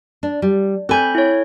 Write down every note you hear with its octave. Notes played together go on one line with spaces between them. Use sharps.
D4
G3
C4 A4 G#5 B5 G6
E4 C#5